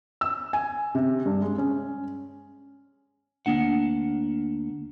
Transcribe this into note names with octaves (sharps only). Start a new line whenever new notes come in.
E6
G#5
C3
G2
G#3
C#4
D2 A#3 D4 F#5